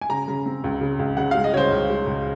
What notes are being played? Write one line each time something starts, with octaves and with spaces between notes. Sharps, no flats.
G#5
C#3 A#5
C#3
C4
C#2
C#3
C#2
C#3 F#5
G#3 F5
D#5
C#3 C5 C#5
C#2
G#3
C#2